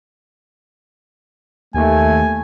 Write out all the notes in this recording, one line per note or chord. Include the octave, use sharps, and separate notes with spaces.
D#2 A3 G#5